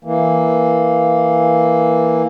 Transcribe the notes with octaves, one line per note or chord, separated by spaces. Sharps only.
E3 A#3